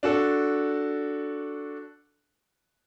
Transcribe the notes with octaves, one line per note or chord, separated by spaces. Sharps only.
D4 F#4 A4